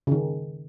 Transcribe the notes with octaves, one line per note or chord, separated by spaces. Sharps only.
C#3
D#3